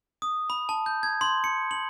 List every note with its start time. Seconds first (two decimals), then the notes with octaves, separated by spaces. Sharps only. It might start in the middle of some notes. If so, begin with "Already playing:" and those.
0.22 D#6
0.50 B5
0.69 A5
0.86 G6
1.03 G#6
1.21 C6
1.44 C#7
1.71 F#7